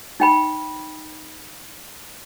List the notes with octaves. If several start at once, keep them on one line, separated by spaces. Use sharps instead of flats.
D#4 G5 B5